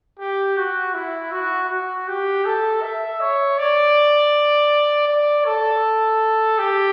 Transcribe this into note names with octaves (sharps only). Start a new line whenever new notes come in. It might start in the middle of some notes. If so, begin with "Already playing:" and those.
G4
F#4
E4
F#4
F#4
G4
A4
E5
C#5
D5
D5
A4
G4